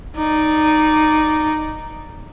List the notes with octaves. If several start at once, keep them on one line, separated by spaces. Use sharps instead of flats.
D#4 D5